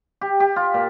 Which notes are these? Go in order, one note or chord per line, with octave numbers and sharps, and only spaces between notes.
G4
G4
F4
A#2